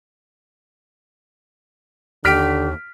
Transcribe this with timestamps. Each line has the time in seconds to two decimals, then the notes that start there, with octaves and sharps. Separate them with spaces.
2.25 D#2 D3 G4 F6 B6 D7